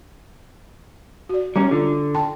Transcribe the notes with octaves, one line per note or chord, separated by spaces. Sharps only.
F#4 D5
G3 C#4 A#5
D3 F4
G5 A5 C6